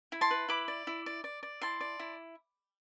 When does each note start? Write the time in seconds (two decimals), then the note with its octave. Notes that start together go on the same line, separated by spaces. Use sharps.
0.12 E4
0.21 A5 C6
0.31 B4
0.48 E4 B5 D6
0.68 D5
0.87 E4
1.06 D5
1.24 D5
1.43 D5
1.61 E4 A5 C6
1.81 D5
1.99 E4